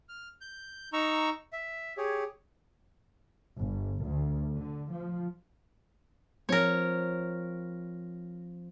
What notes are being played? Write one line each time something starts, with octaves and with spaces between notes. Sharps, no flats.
F6
G6
D#4 A#5 C#6 E6
E5
G4 G#4 C#5
G1
D2
D3
F3
F3 C4 A#4 C#5